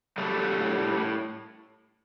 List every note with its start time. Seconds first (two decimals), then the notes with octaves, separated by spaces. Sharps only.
0.18 F#3 G3 A3
0.37 F#3
0.58 A2
0.78 A2
0.97 A2